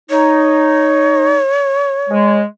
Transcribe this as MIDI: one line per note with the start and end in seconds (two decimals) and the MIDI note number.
0.10 1.38 63
0.10 2.40 73
2.09 2.42 56